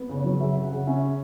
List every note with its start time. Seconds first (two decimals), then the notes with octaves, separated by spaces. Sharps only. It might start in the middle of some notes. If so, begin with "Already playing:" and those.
Already playing: B3
0.09 C#3
0.17 C#5
0.24 F#3
0.40 C#3 E5
0.56 C#3
0.64 F#5
0.71 C#3
0.87 C#4 E5